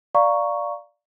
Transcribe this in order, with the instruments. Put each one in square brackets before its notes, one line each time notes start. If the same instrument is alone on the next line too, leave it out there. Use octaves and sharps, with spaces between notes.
[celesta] D5 F5 A#5 C#6